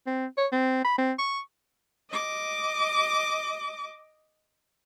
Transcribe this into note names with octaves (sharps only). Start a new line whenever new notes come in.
C4
C#5
C4
B5
C4
C#6
D#5 D6